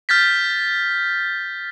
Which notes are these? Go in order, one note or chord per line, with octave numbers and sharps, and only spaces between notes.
F6 G6 A6 B6